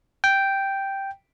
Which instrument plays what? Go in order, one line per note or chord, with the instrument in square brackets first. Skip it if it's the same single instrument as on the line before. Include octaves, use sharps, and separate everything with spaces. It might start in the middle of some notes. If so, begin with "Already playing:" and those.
[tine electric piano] G5